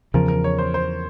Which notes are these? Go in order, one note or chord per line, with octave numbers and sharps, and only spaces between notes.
E2 C#3 F3 A#4
A#4
C#5
C5
C5